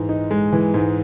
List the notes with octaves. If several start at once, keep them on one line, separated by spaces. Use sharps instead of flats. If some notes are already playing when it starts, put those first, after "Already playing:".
Already playing: G#2 E3 G#3
D#4
G#3
E3
G#2